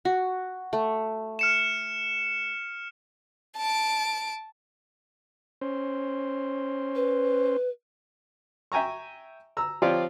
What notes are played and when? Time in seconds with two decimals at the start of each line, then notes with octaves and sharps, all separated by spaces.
0.05 F#4
0.73 A3
1.39 F6 C#7 E7
3.57 A5 D7
5.61 C#4 C5
6.95 B4
8.72 E5 G5 G#5 A#5 C#6
9.57 A#5 E6
9.82 F3 C4 F4 G4 C#5 D5